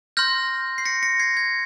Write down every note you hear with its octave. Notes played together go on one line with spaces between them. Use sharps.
C6 F6 G6 A#6
C7
A#6 C#7
A#6 C#7
G#6 C7
G#6